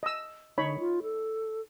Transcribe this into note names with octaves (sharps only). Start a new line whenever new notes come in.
D#5 E6
D3 D#4 C#5 B5
F4
A4